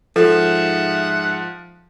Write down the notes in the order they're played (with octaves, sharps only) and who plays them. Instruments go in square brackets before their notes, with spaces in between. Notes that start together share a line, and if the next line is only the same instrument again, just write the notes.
[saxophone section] G#2 E5 F#5 [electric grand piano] F3 [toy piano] A4